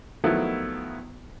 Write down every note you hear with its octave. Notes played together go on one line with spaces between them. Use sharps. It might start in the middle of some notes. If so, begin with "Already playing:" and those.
D#3 F3 F#3 A3 B3 E4